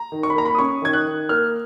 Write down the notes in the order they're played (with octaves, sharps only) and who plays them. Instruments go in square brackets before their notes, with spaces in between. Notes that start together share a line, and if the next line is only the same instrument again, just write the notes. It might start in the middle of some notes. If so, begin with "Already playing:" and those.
Already playing: [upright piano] A#5
D#3
C#6
B5
A#3 A#5
B5
D#6
C#4 C#6
D#3 G#6
F#6
D#3
A#3 F6